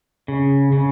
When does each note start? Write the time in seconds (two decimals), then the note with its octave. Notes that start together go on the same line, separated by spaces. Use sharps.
0.28 C#3
0.73 C#3